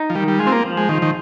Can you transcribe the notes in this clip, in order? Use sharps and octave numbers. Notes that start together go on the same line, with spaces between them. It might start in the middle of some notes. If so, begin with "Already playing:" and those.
Already playing: D#4
F3
D#3 G3
G3
G#3 F4
C4
A#3
F3
G#3
D#3 F4
D#3